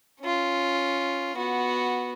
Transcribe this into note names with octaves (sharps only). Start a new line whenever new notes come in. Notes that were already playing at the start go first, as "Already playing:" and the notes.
C#4 F4
B3 F#4